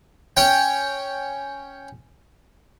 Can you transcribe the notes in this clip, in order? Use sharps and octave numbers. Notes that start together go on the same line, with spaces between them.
C#4 C#5 G5